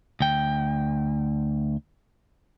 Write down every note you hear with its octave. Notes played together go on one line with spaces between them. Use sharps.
D2 G5